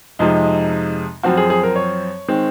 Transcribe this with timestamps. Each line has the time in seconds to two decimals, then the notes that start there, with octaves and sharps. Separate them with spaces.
0.19 F2 C3 F3 G#3 D#4
1.23 F#2 F3 C4 F#4
1.37 G#4
1.50 G#4
1.63 A#4
1.76 C#5
2.28 D#3 G#3 C4